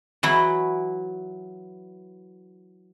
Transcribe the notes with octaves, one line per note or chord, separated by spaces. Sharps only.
E3 F#3 E4